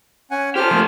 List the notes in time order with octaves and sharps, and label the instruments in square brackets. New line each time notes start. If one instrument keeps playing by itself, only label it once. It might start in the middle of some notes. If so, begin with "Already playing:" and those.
[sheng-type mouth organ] C#4 F#5 G#5
[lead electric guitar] G4 A4 [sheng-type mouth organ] C5 F6
[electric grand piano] F3 A3 A#3